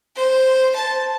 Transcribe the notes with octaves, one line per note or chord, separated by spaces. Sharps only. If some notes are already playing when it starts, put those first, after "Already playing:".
C5
A5